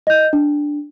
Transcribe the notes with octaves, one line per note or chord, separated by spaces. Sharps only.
D#5 G6
D4